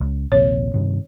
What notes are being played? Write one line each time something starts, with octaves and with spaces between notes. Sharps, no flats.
C#2
A#1 D#2 C3 C#5
G2 C3 D#3